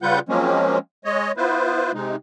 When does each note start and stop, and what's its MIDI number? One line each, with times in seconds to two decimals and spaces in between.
0.02 0.19 49
0.02 0.19 55
0.02 0.19 65
0.02 0.19 71
0.02 0.19 78
0.02 0.19 91
0.29 0.78 53
0.29 0.78 54
0.29 0.78 56
0.29 0.78 58
0.29 0.78 60
0.29 0.78 61
1.05 1.32 56
1.05 1.32 73
1.05 1.32 75
1.37 1.92 59
1.37 1.92 64
1.37 1.92 65
1.37 1.92 71
1.37 1.92 72
1.94 2.16 48
1.94 2.16 56
1.94 2.16 63